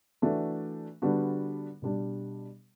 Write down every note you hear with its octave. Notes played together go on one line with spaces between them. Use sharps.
E3 A3 D4 F#4
D3 G3 B3 D4 F#4
B2 G3 D4